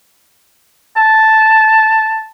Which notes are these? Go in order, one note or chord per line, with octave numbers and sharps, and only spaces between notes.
A5